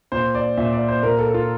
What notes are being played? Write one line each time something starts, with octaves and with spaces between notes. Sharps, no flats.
A#2 C5
D5
A#2 E5
D5
C5
A#2 A#4
A4
F4